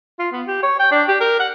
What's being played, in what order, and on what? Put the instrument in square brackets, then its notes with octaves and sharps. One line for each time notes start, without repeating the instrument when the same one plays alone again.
[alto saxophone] F4
B3
G4
C#5
G5
D4
G4
A#4
F#5